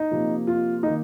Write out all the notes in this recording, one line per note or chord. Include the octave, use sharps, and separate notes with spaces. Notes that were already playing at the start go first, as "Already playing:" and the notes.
Already playing: D#4
C3 F3 A#3
F4
D#3 A#3 D#4